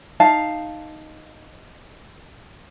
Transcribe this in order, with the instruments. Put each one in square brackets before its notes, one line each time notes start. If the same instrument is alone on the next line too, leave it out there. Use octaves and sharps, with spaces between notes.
[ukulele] D#4 F5 A5